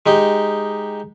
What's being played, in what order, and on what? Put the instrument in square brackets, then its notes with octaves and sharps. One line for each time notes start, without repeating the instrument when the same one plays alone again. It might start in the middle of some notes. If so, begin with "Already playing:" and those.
[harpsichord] G#3 D#4 G4